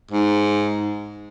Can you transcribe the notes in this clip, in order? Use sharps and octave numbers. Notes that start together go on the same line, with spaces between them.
G#2